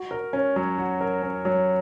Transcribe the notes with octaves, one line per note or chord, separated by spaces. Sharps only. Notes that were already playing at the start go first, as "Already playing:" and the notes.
Already playing: F#4
A#4
C#4
F#3
F#4
A#4
C#4
F#3